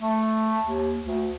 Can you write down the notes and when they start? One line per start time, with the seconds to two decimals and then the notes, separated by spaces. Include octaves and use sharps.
0.01 A3
0.63 D#2
1.03 D2